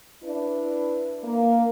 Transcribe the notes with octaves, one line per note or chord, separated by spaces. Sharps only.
D4 E4 B4
A#3